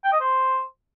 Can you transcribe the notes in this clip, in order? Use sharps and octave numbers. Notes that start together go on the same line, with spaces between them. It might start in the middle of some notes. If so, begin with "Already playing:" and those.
G5
D#5
C5